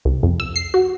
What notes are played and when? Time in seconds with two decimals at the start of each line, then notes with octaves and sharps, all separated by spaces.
0.05 C2
0.23 F2
0.40 E6
0.56 C7
0.74 F#4